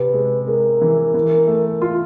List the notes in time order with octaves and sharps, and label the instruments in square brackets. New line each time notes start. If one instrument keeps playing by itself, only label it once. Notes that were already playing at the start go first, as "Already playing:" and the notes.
Already playing: [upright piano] C3 [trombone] B4
[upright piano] G#3
[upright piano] G#3 [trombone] A#4
[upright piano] E3
E3
A3
F4